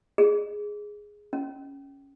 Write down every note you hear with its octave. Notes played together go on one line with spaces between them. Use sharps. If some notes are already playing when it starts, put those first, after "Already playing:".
G#4
C#4